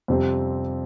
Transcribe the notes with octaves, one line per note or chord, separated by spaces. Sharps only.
F2 C3 G3 C4